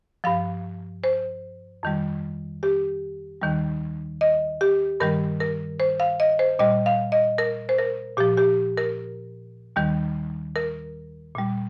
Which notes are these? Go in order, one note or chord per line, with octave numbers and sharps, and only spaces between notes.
G2 F3 F5
C5
F2 D#3 G3
G4
D#2 D#3 G3
D#5
G4
G2 D#3 G3 A#4
A#4
C5
F5
D#5
C5
A#2 G3 D#5
F5
D#5
A#4
C5
A#4
A#2 F3 G4
G4
A#4
D#2 D#3 G3
A#4
A#2 G3